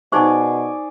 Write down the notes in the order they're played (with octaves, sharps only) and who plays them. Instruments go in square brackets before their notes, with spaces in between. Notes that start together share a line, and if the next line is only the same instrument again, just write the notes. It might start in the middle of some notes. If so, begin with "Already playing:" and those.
[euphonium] B2 [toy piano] D#4 C5 C#6 [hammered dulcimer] G#4 D5 G#5